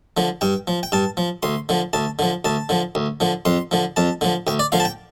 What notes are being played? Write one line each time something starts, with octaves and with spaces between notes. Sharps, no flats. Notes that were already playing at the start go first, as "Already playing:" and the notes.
D3 F3
G2 G5
F3
G5
G2 A5
F3
D2 C6
D3 F3
D2 A5
D3 F3
D2 A5
D3 F3
D2
D3 F3
F2 C6
D3 F3
F2 A5
D3 F3
D2 G5
D5
D3 F3 F5
A5
G5